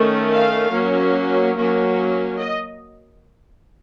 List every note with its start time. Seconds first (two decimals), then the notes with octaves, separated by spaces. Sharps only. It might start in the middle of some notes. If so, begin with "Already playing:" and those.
Already playing: D#3 A3 C#4
0.31 F5
0.73 F#3 A#3 C#4
1.57 F#3 A#3 C#4
2.39 D#5